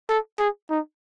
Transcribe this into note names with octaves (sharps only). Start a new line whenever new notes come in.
A4
G#4
D#4